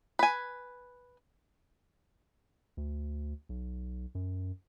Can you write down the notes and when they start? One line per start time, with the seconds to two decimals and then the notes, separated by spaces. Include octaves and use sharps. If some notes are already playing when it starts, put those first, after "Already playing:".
0.19 B4 G#5
2.77 D2
3.49 B1
4.15 F#2